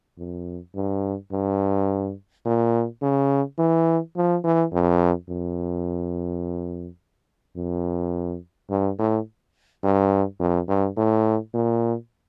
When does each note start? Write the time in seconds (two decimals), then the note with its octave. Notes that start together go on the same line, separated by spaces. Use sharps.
0.19 F2
0.75 G2
1.33 G2
2.46 A#2
3.03 C#3
3.59 E3
4.17 F3
4.44 E3
4.72 F2
5.29 F2
7.57 F2
8.71 G2
8.99 A2
9.84 G2
10.40 F2
10.68 G2
10.97 A2
11.54 A#2